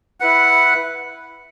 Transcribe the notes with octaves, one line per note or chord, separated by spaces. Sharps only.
E4 B4 F#5